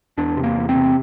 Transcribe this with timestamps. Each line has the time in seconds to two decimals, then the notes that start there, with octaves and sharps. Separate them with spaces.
0.17 E2 D4
0.37 C3
0.43 A#3
0.56 E2
0.69 C4
0.76 C3